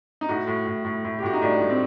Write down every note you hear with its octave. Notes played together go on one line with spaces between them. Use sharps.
D#4
A2 F#4
A2
A2
A2
A2
G4
A2 F#4
D#4
A2 D4
A2
C4